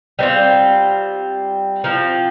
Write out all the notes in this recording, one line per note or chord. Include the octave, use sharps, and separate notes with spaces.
G3 C4 F4
F3 C4 F4